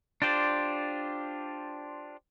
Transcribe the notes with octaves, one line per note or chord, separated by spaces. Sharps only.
D4 F4 G4 C5 D5